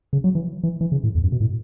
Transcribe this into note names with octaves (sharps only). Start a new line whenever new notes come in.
C#3
F#3
E3
E3
E3
C#3
A2
E2
F#2
B2
A2